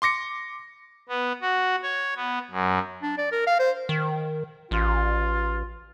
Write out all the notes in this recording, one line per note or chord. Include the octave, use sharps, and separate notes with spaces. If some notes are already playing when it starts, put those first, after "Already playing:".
C6 D6 A#6 C#7
B3
F#4
C#5
B3
F#2
D4
D5
A#4
F5
C5
D#3
A1 F4